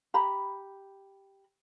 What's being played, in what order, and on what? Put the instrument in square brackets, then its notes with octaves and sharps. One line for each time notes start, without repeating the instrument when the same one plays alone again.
[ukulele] G4 A#5 B5